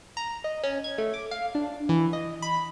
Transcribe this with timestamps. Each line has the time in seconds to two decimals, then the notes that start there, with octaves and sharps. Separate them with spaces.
0.17 A#5
0.44 D#5
0.63 C#4
0.84 G#6
0.98 A3
1.14 D6
1.31 F5
1.55 D4
1.89 E3
2.13 D#5
2.42 B5